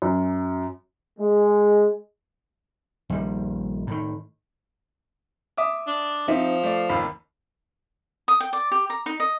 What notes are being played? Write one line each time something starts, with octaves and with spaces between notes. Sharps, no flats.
F#2
G#3
A#1 D#3 G3
A2 D#3
E5 D6 D#6
D4
F3 C4 D#4 E5
A3 D5
F1 D#2 B5
D#6
G5
D5
G4
A#5
D#4
D#5